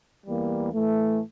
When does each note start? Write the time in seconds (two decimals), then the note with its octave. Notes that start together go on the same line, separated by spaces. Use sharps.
0.26 E2 E3 G3 A#3
0.73 A2 E3 A3